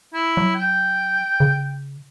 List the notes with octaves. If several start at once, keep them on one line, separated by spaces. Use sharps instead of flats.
E4
F#3
G5
C#3